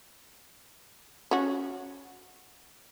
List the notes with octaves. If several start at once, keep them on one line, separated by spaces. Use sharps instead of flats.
C#4 F#4